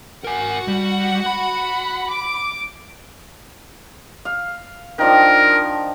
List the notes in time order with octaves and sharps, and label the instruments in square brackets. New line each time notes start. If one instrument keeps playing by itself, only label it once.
[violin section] F#4 F#5 [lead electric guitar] A#4 G#5
[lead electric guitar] G3
B5
[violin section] D6
[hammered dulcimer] F5
[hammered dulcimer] D#3 F3 D4 [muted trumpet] A#4